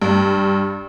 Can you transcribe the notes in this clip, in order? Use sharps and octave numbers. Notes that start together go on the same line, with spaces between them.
G2